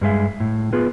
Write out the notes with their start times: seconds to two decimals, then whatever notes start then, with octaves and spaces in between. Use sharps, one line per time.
0.01 G2 F#3 G#3 G#4 E5 F5
0.40 A2
0.73 B3 F4 G#4 B4